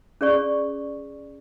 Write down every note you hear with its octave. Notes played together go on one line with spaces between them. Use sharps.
C#4 G#4 D5 C#6